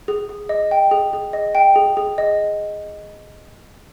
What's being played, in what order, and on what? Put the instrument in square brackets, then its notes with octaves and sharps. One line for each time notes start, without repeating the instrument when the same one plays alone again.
[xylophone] G#4
G#4
D#5
G5
G#4
G#4
D#5
G5
G#4
G#4
D#5